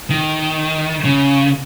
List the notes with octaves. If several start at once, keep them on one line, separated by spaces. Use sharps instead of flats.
D#3
C#3